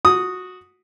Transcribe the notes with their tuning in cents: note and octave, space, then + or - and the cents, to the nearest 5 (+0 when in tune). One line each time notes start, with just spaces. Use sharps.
F#4 -10 D#6 +0